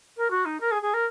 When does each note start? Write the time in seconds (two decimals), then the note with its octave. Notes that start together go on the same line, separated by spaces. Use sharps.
0.17 A#4
0.30 F#4
0.45 D#4
0.60 A#4
0.71 G#4
0.82 G#4
0.94 A#4